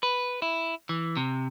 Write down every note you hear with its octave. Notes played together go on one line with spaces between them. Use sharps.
B4
E4
E3
C3